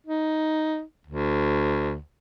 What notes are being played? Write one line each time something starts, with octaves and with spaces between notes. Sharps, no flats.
D#4
D2